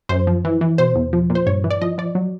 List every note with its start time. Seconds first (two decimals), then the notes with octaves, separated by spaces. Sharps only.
0.09 F#2 C5
0.27 F3
0.45 E3
0.61 E3
0.78 B2 C5
0.95 E2
1.13 F3
1.30 A#2
1.35 C5
1.46 G2 C#5
1.64 E3
1.71 D5
1.81 F3 D#5
1.98 F3 D5
2.15 F#3